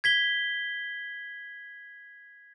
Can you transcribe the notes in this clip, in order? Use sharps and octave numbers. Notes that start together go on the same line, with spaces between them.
G#6 B6 G7